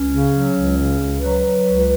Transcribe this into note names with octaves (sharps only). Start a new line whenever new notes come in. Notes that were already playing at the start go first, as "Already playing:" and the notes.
Already playing: C#2 C#4
C#3
F#3
C#2
C#3
C#2
F#3 B4
F#3
C#2